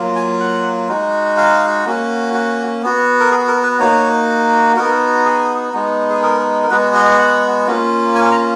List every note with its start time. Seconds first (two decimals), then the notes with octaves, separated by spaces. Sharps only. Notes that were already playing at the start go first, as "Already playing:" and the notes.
Already playing: F#3 A#3 F4
0.16 G#5
0.40 F#5
0.88 G#3 D#4 F#4
1.37 F5
1.85 A#3 C#4 F#4
2.34 F#4
2.83 B3 F#4
3.20 A#4
3.31 G#4
3.48 A#4
3.63 B4
3.80 A#3 D#4 F#4 C#5
4.76 B3 D#4 F#4 A#4
5.25 G#4
5.73 G#3 B3 D#4
6.10 G#4
6.22 A#4
6.63 A#4
6.70 G#3 B3 F#4 B4
6.94 D#5
7.18 F#5
7.67 A#3 C#4 F4
8.15 G#5
8.32 A#5